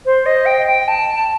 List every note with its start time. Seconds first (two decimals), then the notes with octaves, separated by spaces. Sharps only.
0.05 C5
0.26 D#5
0.46 G5
0.67 G5
0.88 A5